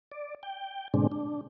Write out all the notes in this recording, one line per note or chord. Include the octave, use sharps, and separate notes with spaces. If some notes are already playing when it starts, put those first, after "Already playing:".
D5
G5
G#2 B2 D3 G#3 C4 D4
D4